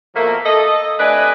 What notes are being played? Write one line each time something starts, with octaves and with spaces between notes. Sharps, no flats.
B2 F3 A3 A#3
A4 D#5
C3 A3 D4 B4 D#5 G#5